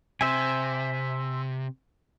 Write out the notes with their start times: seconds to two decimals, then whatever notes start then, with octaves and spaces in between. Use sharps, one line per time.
0.21 C3 C5 E5 G#5